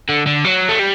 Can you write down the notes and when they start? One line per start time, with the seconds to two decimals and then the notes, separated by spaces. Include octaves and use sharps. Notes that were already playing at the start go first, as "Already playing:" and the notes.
0.09 D3
0.27 D3
0.44 F#3
0.69 A3
0.79 G3